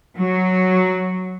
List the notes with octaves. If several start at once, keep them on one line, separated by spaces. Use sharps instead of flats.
F#3